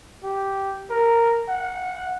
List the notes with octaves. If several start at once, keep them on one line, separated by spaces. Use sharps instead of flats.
G4
A#4
F#5